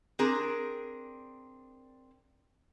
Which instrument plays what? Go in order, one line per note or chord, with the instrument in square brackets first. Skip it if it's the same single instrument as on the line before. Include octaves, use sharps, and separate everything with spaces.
[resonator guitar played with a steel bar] C4 D4 G#4 A#4